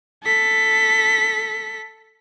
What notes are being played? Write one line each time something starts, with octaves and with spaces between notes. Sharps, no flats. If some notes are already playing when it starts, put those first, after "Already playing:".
A4 B6